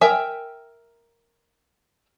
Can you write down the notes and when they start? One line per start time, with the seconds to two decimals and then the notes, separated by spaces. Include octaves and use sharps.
0.01 A#4 E5 G5 G#5